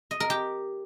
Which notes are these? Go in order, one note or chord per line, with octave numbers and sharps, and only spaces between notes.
D#5
A#4
G4